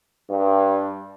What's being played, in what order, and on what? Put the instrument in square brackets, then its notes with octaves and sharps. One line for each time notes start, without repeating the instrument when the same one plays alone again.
[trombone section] G2